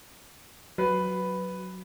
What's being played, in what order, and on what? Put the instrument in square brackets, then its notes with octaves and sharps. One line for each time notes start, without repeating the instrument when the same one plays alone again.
[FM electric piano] F#3 F#4 [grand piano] B4